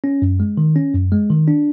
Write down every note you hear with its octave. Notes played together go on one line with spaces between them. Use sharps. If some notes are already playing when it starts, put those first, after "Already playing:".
C#4
F#2
G#3
D#3
C#4
F#2
G#3
D#3
D4